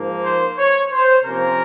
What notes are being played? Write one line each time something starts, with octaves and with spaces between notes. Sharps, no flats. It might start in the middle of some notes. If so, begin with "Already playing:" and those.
Already playing: G#2 F3 A#3
C5
C#5
C5
C3 F3 A#3 C#4 A#4